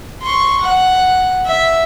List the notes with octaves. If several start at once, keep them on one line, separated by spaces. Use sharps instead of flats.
C6 C#6
F#5
E5